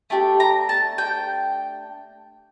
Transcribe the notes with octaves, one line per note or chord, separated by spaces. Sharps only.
A3 D4 G4
A#5
A5
G5